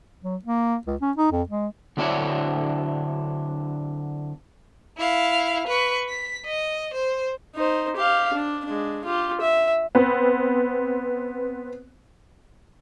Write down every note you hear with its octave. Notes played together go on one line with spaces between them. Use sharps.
F#3
A#3
C#2
C#4
D#4
F2
G#3
D3 F#3 C4 D4 E4 C#5
E4 F5
B4 C#6
B6
D#5
C5
D#4 C5
G4 F5
D4
G#3 D4
F4 G4
E5
B3 C4